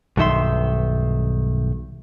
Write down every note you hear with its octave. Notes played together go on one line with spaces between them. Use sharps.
B1 G2 D#3 E5 C6